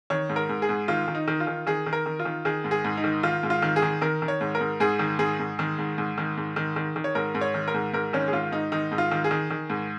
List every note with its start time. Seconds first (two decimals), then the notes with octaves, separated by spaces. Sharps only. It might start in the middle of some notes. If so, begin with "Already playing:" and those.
0.10 D#3 C#5
0.29 G#2
0.36 A#4
0.49 G#2
0.62 G#4
0.69 G#2
0.88 D#3 F4
1.08 D#3
1.15 D#4
1.28 D#3
1.40 F4
1.47 D#3
1.67 D#3 G#4
1.86 D#3
1.93 A#4
2.06 D#3
2.19 F4
2.25 D#3
2.45 D#3 G#4
2.64 G#2
2.71 G#4
2.85 G#2
2.97 D#4
3.04 D#3
3.23 D#3 F4
3.43 G#2
3.50 F4
3.62 D#3
3.76 G#4
3.82 D#3
4.02 D#3 A#4
4.22 D#3
4.28 C#5
4.41 G#2
4.55 A#4
4.61 G#2
4.80 G#2 G#4
4.99 D#3
5.19 G#2 G#4
5.39 G#2
5.59 D#3
5.78 G#2
5.98 G#2
6.18 D#3
6.37 G#2
6.56 D#3
6.76 D#3
6.96 D#3
7.04 C#5
7.15 G#2 A#4
7.35 G#2
7.41 C#5
7.54 D#3
7.68 A#4
7.74 G#2
7.93 G#2 A#4
8.13 D#3 C#4
8.28 G#4
8.33 G#2 F4
8.52 G#2 D#4
8.72 D#3 D#4
8.92 G#2
8.98 F4
9.11 D#3
9.24 G#4
9.31 D#3
9.50 D#3
9.70 G#2